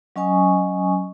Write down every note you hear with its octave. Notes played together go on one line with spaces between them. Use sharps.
F#3 C#4 D#5 G#5 C#6 D#6